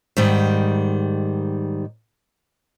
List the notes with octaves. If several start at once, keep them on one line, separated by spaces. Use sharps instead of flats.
G#2 D#3 G3